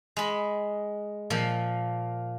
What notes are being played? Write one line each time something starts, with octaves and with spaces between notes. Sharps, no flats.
G#3 B5
A#2 F3